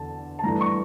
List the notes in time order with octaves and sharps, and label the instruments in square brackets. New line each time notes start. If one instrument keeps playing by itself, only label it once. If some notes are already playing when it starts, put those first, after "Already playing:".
Already playing: [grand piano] E2 D3 A5
A5
G2 E3 A3 A#5
C#6